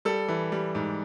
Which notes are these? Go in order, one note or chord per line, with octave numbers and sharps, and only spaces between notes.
G3 A4
E3
G3
G#2